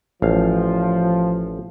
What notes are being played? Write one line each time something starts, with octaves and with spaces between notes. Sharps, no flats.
A1 F3 F5